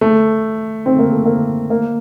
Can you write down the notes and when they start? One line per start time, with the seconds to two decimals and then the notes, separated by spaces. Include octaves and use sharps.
0.01 A3
0.86 C4
0.99 A#3
1.12 A3
1.25 A#3
1.70 A#3